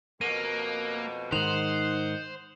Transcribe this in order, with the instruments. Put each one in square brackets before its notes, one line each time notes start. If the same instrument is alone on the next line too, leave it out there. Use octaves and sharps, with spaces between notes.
[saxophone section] F2 B2 [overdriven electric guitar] A#3 [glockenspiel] D#7
[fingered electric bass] G#2 D#3 [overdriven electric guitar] C5 [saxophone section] D#5 F#5 [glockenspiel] F7 F#7